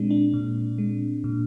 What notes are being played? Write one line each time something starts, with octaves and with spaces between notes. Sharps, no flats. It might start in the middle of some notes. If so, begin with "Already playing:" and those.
Already playing: A#2 G#3 C4 D4
D4
A#2
G#3
A#2